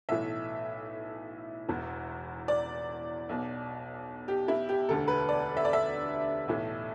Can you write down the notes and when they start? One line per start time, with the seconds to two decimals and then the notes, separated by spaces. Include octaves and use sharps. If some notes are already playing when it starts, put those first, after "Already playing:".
0.09 B1 A2 E3 E5
1.69 E1 E2 E3
2.48 D5
3.29 B1 B2
4.28 G4
4.48 E4
4.69 G4
4.88 E1 D2 D3 A4
5.08 B4
5.29 D5
5.57 E5
5.65 D5
5.73 E5
6.47 B1 A2 E3